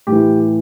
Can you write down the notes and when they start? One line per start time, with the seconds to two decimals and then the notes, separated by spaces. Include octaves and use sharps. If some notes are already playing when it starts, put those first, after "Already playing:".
0.07 A2 E3 G4